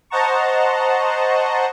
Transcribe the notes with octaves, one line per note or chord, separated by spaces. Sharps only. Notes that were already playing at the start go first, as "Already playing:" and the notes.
C5 D#5 F#5 A5 A#5 C#6